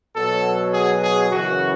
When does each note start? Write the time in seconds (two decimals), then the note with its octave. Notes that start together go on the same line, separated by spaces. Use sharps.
0.15 B2 F#3 A4
0.73 G#4
1.03 G#4
1.32 F#2 C#3 E3 F#4